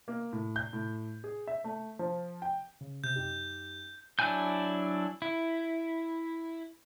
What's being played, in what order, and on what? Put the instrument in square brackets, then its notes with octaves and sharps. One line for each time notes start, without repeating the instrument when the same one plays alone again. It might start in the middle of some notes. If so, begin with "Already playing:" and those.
[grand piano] A#3
A2
G6
A2
G#4
E5
A3
F3
G5
[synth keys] C#3
[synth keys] C3 [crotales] G6
[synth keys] F#2 D#4 G4
[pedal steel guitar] F#3 D4 E4 G#5 G6
E4